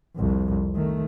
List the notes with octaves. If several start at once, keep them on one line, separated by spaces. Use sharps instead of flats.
C2 F2
D#3 A3